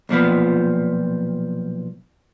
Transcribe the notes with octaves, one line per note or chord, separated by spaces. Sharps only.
B1 A#2 F3 B3